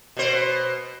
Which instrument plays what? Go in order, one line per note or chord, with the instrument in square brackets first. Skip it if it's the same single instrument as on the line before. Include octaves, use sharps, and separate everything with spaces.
[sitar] B2 C5